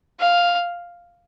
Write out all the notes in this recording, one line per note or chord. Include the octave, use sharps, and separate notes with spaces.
F5